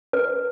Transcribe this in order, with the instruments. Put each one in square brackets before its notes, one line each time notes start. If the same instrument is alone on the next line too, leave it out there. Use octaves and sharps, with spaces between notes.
[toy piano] B4